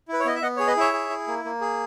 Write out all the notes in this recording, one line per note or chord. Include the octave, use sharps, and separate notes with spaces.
E4
B4
C#5
B3 D#5
E5
B3 D#5 F#5
G#4 C#5
B4 D#5
E4 C#5 E5
G#4
E4
A#3
A#3
G#4